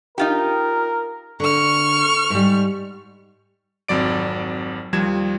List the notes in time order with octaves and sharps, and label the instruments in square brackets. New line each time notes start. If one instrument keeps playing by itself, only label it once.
[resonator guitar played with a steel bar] D#4 F4 G4 [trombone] A#4
[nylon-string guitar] D3 [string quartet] C#6 F6
[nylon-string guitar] G#2 G3
[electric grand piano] G#1 F2 F#3 D5 D7
D#2 F3 G3 G#6 E7